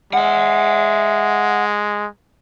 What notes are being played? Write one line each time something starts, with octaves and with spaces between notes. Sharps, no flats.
G#3 E5 F#5